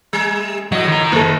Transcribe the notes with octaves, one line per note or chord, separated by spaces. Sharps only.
G3
A2 F#3 F#4 D#5
D#3 A#5
F#1 A4